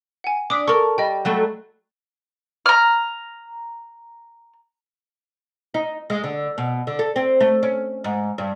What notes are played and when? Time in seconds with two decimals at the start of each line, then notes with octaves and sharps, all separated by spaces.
0.24 F#5 G#5
0.50 D4 D6 D#6 B6
0.68 A4 A#4 C#6
0.98 G3 D#5 G5
1.25 F#3 G3 A3
2.66 A#5 F6
5.74 D#4
6.10 G#3
6.24 D3
6.58 B2
6.87 D3
6.99 A4
7.16 C4
7.40 A3
7.63 C#4
8.04 G#2
8.38 G2